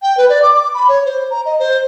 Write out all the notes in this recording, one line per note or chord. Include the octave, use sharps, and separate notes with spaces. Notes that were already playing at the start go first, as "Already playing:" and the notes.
G5
B4
D5
D6
D6
B5
C#5
C5
A#5
D#5
C5